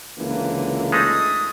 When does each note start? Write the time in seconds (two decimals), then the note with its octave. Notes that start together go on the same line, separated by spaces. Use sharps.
0.18 C#2 D3 E3 A#3
0.92 G#3 A3 D#4 D#6